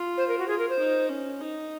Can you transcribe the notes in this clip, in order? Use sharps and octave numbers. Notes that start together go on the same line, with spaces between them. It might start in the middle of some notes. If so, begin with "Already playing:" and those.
Already playing: F4
C5
A#4
F#4
F4 G#4
A#4
C5
D#4
C#4
D#4